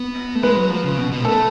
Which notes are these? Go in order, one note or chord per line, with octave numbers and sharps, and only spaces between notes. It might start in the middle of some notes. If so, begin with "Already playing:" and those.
Already playing: B3
A3
G#3 B4
F#3
F3
C#3
B2
B2
G#3
A3 A4